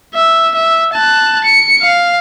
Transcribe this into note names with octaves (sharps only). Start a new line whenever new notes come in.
E5
E5
A5 F#6
C#7
F5